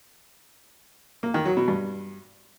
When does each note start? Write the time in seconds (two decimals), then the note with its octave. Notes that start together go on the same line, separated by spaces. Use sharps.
1.23 A#3
1.34 D#3
1.45 F#3
1.57 B2
1.68 G2